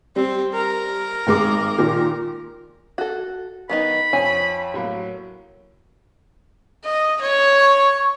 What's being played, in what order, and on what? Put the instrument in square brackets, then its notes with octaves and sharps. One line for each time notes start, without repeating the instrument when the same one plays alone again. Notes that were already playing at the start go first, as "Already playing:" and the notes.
[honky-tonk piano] G3 [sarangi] C4
[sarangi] A#4
[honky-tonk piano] G#1 G#3 D6
A#2 D#3
[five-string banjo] F#4 A4
[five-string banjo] D#3 B3 D#4 [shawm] B5
[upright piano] F2 [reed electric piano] C#5 [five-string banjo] G#5
[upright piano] A2 F#3 A#3
[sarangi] D#5
C#5
[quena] C#6